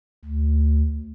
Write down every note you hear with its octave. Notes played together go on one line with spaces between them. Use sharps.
D2